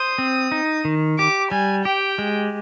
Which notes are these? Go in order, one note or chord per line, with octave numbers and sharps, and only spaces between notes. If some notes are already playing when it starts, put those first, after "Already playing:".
Already playing: C5 D#6
C4
D#4
D#3
G4 D6
G3 G#5
G4 G5
G#3